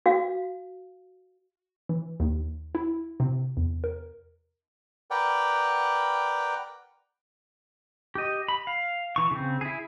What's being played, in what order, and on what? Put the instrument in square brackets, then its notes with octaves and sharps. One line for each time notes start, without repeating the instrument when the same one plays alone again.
[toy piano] F#4 F5
[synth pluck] E3
D#2
E4
C3
E2
A#4
[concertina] A#4 B4 D5 F#5 G5
[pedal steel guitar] G4 D#5
B5
F5
E3 C#6
C#3 C4
E4 G#4